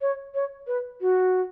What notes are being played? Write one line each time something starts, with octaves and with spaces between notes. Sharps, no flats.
C#5
C#5
B4
F#4